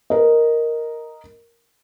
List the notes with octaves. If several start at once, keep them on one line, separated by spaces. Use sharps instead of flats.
A#4 D#5